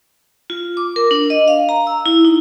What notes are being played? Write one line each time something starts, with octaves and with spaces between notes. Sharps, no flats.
F4
D6
A#4
D4
D#5
F5
A#5
E6
E4
D#4